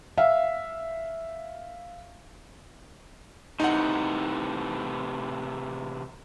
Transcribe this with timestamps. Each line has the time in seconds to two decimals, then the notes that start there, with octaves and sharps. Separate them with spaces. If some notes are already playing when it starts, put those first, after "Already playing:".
0.17 E5 F5
3.60 A2 C3 E3 D#4 F#5